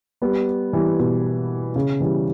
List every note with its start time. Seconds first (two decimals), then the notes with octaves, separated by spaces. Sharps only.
0.22 G3 B3
0.73 E3 G3
0.99 B2
1.76 C#3
2.00 E3 G3